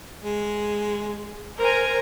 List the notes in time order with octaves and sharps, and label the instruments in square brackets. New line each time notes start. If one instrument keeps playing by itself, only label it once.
[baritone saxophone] G#3
[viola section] A#4 A#5 [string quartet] C5 G#5